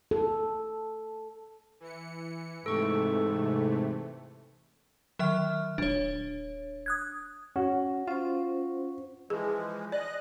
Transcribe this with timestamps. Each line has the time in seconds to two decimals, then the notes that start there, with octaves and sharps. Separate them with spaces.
0.11 A4
1.80 E3 C#7
2.66 G#2 C3 E3 A3 A4 C#6
5.19 D#3 F#3 E5 F6
5.78 D#1 D4 C#5
6.86 D#6 F#6 G#6
7.56 C#4 F#4
8.08 C#4 F4 C5
9.30 E3 F3 G#3 G#4
9.92 D5 D#5 F#6